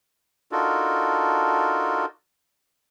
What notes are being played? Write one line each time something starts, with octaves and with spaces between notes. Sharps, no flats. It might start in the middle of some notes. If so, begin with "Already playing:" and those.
D4 D#4 F4 F#4 A4 A#4